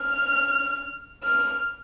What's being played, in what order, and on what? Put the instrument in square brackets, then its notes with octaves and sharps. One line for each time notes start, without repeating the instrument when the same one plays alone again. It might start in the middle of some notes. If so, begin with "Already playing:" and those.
Already playing: [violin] F6
F6